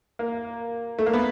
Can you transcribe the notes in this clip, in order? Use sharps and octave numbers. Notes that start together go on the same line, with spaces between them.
A#3
A3
A#3
B3